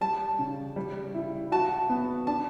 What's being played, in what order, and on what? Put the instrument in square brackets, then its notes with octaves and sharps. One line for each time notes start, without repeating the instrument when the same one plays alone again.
[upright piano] G3 [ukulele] A5
[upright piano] C#3
G3
E4
[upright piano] F#4 [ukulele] A5
[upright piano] B3
[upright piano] D4 [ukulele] A5